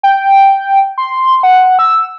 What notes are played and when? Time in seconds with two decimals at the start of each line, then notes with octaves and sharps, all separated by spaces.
0.03 G5
0.98 C6
1.43 F#5
1.79 E6